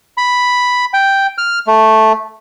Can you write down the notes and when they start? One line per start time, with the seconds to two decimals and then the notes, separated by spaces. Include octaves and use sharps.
0.18 B5
0.94 G5
1.38 F6
1.67 A3